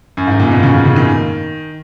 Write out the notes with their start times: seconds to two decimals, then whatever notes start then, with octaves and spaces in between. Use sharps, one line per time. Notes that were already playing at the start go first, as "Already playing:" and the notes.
0.17 F#2
0.27 G#2
0.40 A#2
0.51 B2
0.63 C#3
0.86 C#3
0.96 D#3